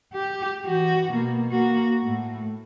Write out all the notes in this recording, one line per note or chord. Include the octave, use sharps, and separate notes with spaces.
G4
E3 F#4
B2 A#3
A#3 F#4
A2 A3